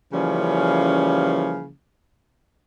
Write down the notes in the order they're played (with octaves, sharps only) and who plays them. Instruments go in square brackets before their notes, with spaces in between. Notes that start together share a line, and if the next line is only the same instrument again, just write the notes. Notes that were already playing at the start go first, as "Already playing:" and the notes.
[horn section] C#3 E3 F3 G3 A#3 C#4